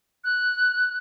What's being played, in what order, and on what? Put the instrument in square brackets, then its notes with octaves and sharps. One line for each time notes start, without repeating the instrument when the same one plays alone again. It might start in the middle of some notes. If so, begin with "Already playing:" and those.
[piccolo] F#6